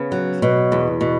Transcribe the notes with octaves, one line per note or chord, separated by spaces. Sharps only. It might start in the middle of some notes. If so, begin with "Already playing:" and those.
Already playing: C#3 B3
F#3
B2
E2
B2